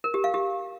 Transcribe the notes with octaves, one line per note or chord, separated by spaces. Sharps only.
A#4
G4
F5
G4